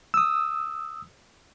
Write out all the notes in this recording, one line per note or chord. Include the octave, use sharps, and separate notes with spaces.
D#6 E6